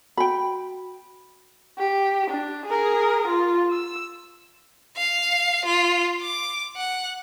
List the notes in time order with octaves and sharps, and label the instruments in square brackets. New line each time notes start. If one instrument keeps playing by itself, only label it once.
[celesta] F#4 [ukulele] G5 B5
[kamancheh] G4
D4
G#4 A#4
F4
E6
[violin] F5
F4
D6
F#5